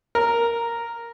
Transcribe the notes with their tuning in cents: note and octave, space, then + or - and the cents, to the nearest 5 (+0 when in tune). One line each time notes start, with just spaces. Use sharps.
A#4 -5